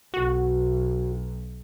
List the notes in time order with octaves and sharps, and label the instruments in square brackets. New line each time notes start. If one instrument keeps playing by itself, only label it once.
[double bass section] B1 [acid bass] F#4